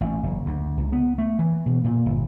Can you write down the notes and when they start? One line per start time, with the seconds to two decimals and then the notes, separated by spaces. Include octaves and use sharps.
0.01 A1
0.23 F#1
0.46 D2
0.77 C#2
0.92 B3
1.18 A3
1.39 E3
1.66 B2
1.84 A#2
2.06 G1